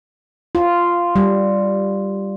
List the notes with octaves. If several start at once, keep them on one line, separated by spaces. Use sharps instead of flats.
F4
G3